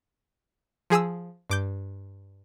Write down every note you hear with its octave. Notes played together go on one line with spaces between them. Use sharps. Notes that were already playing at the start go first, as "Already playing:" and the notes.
F3 G#4 G#5 D#6 E6
G2 D6 G6